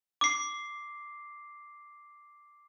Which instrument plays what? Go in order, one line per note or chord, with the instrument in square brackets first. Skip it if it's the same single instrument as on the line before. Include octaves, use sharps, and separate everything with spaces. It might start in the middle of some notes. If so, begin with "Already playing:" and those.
[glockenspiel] D6 C7